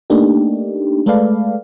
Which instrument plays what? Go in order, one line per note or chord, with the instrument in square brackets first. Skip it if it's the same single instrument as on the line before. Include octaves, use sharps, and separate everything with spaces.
[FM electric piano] A3 A#3 D4 D#4 G4
G#3 A3 A4 B4 D5 F5